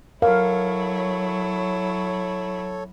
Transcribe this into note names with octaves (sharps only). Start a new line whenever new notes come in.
F#3 E4 A4 A#4 C#5 F5